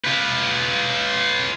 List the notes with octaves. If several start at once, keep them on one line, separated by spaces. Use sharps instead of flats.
F4 B4